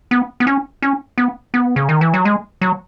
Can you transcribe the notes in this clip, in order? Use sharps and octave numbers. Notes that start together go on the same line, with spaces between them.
B3
B3
C#4
C#4
B3
B3
C#3
D#3
E3
F#3
G#3
F#3